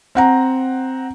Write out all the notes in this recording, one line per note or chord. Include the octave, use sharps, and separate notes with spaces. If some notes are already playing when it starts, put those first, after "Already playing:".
C4 F#5 A#5